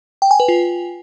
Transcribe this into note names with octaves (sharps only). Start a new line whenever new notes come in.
G5
G#5
B4
F4